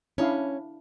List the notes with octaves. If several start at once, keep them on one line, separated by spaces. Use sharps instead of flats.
C#4 D4 E4 F5